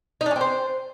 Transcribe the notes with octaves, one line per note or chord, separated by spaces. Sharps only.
D#4
D4
C#4
C4
C5